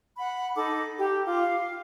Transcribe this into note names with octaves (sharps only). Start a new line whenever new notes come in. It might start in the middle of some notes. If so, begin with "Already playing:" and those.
F#5 B5
D#4 A4 D6
G4
F4 D6
F5